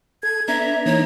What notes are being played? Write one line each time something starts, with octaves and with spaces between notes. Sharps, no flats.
A4 G#6
B3 D4 E5 A#5
E3 A#3 D#4 C#5